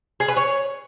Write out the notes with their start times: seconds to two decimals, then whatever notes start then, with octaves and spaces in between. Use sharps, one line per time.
0.20 G#4
0.28 B4
0.37 C#5